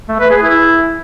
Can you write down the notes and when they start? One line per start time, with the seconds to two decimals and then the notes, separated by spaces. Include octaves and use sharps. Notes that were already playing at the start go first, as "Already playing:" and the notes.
0.09 A3
0.20 B4
0.31 G#4
0.42 E4